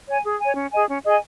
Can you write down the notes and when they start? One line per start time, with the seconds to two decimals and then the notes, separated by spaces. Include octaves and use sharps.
0.08 C#5 G#5
0.24 G#4
0.40 C#5 G#5
0.57 C#4
0.72 G#4 D#5 G#5
0.88 C#4
1.04 G#4 D#5 G#5